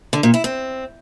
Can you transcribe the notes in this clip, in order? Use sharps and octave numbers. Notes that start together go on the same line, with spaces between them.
D3
A#2
E4
C4